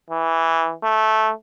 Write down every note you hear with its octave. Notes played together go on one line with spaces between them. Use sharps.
E3
A3